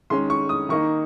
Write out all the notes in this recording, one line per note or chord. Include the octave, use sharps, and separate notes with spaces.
D#3 G#3 C#4 C6
C#6
D#6
D#3 A#3 D#4 C#6